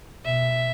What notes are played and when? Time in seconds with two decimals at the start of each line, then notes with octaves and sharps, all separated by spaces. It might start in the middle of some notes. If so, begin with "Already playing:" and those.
0.25 B2 E5